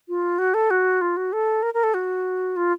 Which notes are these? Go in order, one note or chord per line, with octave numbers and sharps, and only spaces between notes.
F4
F#4
A4
F#4
F4
F#4
A4
A#4
A#4
A4
F#4
F4